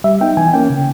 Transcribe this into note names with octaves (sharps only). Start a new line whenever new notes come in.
G3 E5
B3 D#4 G5
E3 G#5
A#3 C#4 G5
C#3